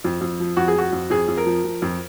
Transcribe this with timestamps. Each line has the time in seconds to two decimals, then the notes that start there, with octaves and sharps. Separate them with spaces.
0.04 F2
0.21 F2
0.40 F3
0.57 F2 F#4
0.68 G#4
0.76 F3 F#4
0.93 F2
1.10 F2 G#4
1.28 F2
1.37 A#4
1.46 F3
1.64 F3
1.82 F2